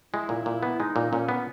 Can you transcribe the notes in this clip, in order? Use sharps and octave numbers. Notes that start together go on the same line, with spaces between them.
G#3 E4
A#2
A#2
B3
G#3 D#4
A#2
A#2 C#4
B3